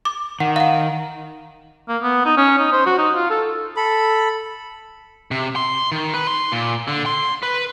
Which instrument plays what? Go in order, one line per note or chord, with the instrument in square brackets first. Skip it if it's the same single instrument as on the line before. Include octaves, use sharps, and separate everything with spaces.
[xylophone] D6
[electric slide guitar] D#3 [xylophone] F#5
[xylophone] F5 F#5
[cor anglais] A#3
B3
D#4
C#4
D#4
C5
F#4
D#4
F4
A4
[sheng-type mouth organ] A4 B5
[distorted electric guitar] C3
C6
D#3
B4
C6
A#2
D3
C6
B4